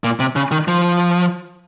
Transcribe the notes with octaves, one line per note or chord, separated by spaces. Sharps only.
A#2
C3
C#3
D#3
F3